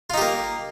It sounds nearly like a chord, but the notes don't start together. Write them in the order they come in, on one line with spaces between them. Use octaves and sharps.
F4 D#4 G4 A#3